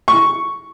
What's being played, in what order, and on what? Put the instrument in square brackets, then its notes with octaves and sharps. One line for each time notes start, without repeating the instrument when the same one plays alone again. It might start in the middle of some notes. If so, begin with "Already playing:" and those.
[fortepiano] C#6